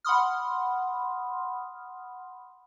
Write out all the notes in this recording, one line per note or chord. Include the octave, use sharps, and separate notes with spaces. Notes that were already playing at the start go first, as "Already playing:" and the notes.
F#5 B5 C6 D#6 F6